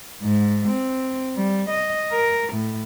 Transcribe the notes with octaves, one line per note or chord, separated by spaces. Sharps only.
G#2
C4
G3
D#5
A#4
A2